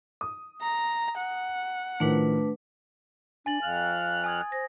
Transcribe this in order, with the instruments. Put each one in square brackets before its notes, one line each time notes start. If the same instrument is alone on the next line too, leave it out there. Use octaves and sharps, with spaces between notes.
[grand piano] D#6
[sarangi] A#5
F#5
[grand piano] A2 D#3 F3 [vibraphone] A3 D4 B4
[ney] D4 [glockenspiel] G#5 A6 F#7
[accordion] F2 F6 F#6 [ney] F5
[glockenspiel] G#5 D#6 G#6
[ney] C5 [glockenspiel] A#6